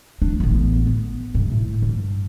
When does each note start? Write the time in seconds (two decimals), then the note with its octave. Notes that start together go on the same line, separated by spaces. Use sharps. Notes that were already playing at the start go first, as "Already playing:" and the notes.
0.22 D4
0.40 A1 B3
0.87 B3
1.34 G2 C3
1.52 A2
1.82 G2